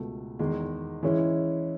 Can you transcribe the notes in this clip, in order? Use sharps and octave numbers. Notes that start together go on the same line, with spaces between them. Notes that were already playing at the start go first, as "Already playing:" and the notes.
Already playing: C#2 B2 A3
E2 D#3 G#3
E3 G#3 C#4 E4